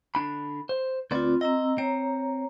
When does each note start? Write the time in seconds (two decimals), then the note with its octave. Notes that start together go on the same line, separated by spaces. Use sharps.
0.15 D3 D4 B5
0.69 C5
1.11 D2 C4 F4 B4 D5
1.41 C4 D#5 A#5 E6
1.78 C4 C#5 A#5